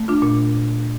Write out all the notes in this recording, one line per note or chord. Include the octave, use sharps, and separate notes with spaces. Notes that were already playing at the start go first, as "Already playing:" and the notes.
Already playing: A3
D4 F4
A#2